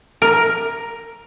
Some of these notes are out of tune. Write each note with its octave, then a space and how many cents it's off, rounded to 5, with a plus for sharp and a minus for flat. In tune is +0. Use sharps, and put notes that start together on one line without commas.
A#4 +5